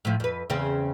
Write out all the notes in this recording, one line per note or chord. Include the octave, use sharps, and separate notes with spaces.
A2 F3
F2 B4
E2 C#3 C4